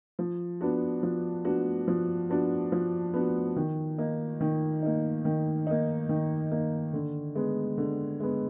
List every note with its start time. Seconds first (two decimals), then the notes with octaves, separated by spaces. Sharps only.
0.19 F3
0.61 B3 D4 F#4
1.03 F3
1.45 B3 D4 F#4
1.88 F3
2.29 B3 D4 F#4
2.72 F3
3.14 B3 D4 F#4
3.56 D#3
3.98 A#3 D#4
4.41 D#3
4.83 A#3 D#4
5.25 D#3
5.67 A#3 D#4
6.09 D#3
6.51 A#3 D#4
6.94 D3
7.35 G#3 B3
7.78 D3
8.20 G#3 B3